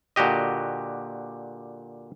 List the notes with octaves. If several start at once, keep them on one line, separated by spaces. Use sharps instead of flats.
A#2 D3 F#4 G4 D#5